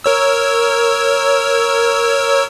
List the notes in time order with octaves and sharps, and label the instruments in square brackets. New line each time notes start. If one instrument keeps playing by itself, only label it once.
[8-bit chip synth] A#4 C#5 E6